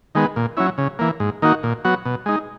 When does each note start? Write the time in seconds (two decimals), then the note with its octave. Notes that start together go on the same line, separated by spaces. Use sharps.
0.15 D#3 G#3 B3
0.36 A#2
0.57 F#3 C#4 E4
0.78 C#3
0.99 E3 A#3
1.20 G#2
1.42 D#3 A#3 D#4 F#4
1.63 A#2
1.85 F#3 B3 F#4
2.05 B2
2.26 G#3 D#4